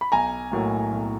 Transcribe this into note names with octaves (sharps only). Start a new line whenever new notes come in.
B5
B1 G#5 A#5
A2 F#3 A#3
B1